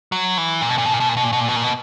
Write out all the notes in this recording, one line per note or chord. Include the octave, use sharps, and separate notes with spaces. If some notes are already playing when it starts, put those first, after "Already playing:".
F#3
E3
A#2
B2
A#2
B2
A#2
B2
A#2
B2
A#2
B2
A#2
B2
A#2
B2